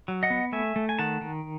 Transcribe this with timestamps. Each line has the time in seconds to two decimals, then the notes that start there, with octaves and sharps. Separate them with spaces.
0.08 F#3
0.23 D#5 F#5
0.30 B3
0.52 A3 E5 G#5
0.76 A3
0.89 G#5
0.99 D#3 F#5 A5
1.21 D#3